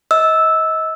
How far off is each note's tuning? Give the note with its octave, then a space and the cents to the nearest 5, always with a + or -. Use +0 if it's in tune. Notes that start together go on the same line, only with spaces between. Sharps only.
D#5 +30 E6 -5